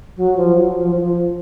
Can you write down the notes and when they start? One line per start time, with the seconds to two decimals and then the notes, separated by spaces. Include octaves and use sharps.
0.16 F#3
0.36 F3
0.55 F#3
0.75 F3
0.95 F3